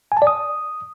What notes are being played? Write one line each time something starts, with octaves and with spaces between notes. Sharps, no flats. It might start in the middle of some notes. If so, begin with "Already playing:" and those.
G#5
A5
D5
D#6